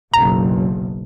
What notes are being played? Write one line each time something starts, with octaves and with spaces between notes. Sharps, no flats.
F#1 B1 A#5